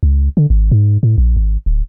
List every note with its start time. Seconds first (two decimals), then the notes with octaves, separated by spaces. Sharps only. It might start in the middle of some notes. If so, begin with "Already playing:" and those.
0.03 C#2
0.37 D3
0.50 G#1
0.71 G#2
1.03 A2
1.18 A#1
1.37 G#1
1.66 D1